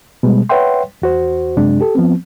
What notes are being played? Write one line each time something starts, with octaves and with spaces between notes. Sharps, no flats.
B2 G3 G#3
B4 C#5 E5 F#5 G5 C6
E2 F#4 C5
F#2 C3 G#3 D4
G4 A4
F3 B3 C4